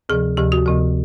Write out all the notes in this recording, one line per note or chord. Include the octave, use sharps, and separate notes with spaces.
D2 C3 F3 G#4
D2 C3 F3 G4
F#4
D2 C3 F3